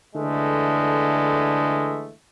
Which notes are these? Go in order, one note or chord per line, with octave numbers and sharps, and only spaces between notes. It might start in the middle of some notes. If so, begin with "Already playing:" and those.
D3 E3 G#3 A3